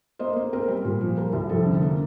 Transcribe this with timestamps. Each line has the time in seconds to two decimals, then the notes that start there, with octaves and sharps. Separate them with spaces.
0.19 A#3 C5 D#5
0.36 A#3
0.53 C4 A#4
0.68 G3
0.85 A#2
1.01 F3
1.17 G3 A#4
1.33 C2
1.49 F2 A4
1.66 D3
1.82 A#3